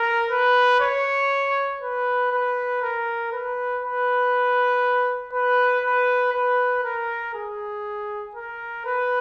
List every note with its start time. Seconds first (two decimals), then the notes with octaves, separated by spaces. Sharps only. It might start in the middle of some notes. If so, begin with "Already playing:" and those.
Already playing: A#4
0.30 B4
0.80 C#5
1.82 B4
2.32 B4
2.82 A#4
3.32 B4
3.83 B4
5.33 B4
5.84 B4
6.34 B4
6.84 A#4
7.34 G#4
8.36 A#4
8.85 B4